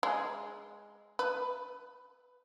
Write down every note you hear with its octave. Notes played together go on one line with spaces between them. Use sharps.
G#3
B4